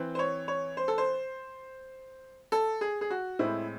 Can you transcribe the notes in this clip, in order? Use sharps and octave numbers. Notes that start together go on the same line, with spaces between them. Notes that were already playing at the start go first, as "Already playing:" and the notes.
Already playing: E3 C4
C5
C#5
C#5
C5
A4
C5
A4
G#4
G#4
F#4
A2 G#3 C4 E4